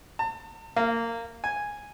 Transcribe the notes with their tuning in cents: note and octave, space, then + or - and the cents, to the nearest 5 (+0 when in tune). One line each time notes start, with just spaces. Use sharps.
A5 +40
A#3 -15
G#5 -5